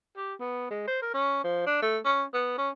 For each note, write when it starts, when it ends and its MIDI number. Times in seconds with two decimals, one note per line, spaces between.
0.17 0.34 67
0.40 0.69 59
0.71 0.85 56
0.88 1.02 72
1.02 1.12 70
1.14 1.40 61
1.44 1.65 53
1.67 1.81 62
1.83 1.98 57
2.05 2.24 61
2.34 2.57 59
2.58 2.70 61